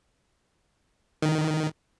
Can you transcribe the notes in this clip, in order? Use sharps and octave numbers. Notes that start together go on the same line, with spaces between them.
D#3